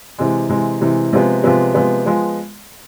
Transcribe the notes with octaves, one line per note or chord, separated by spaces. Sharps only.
C3 E3 G#3
C3 E3 G#3
C3 E3 G#3
C3 F3 G#3 B3
C3 F3 G#3 B3
C3 F3 G#3 B3
F3 G#3 B3